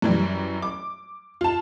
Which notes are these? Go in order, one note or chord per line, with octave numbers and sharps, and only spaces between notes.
F#2 E3 G3
D6
F4 A5